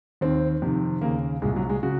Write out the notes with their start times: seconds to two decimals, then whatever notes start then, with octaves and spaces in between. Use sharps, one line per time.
0.21 D#2 D#3 C4
0.62 F2 C3 D#3
1.01 D#2 C#3 A#3
1.42 C2 A#2 G#3
1.56 F#3
1.69 G#3
1.83 C#3 F#4